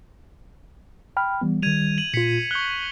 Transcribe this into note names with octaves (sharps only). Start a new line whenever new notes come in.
G5 B5 F6
E3 G3 B3
D#3 G3 G#6 D#7 F7
D#7 F#7
A#2 F4 B6 C#7
C#6 F#6 G6 G7